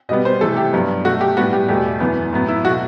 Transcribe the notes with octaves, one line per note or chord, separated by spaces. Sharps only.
B2 G3 B3 D#5
C5
C3 E3 A3 A4
G4
G2 F#3 B3
B2 A3 F#4
G4
A2 G3 B3 F#4
G4
E2 B2 A3 G4
F#2 E3 B3
A2 F#3 B3
E4
B2 A3 F#4